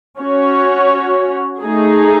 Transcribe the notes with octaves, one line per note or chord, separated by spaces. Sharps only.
C#4 F#4 C#5
A3 D#4 G#4